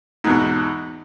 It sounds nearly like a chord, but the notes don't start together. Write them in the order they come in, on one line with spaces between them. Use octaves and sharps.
G#2 E2 B2